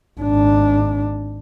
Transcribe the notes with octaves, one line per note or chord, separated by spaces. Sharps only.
G#1 D4